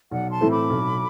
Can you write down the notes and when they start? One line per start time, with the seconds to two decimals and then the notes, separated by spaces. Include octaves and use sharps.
0.11 B1 D5 F#5
0.30 A5 C6
0.41 A2 E3 A3 C4
0.51 B5 D6
0.70 B1